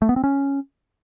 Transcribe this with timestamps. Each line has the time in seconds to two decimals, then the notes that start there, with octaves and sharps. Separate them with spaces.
0.02 A3
0.09 B3
0.16 C4
0.24 C#4